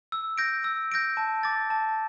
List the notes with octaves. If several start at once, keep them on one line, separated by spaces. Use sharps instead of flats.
E6
G6 A#6 D7
E6
G6 A#6 D7
A5
D6 A6
A5